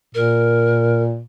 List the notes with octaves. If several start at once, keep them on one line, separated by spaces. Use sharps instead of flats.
A#2 A#4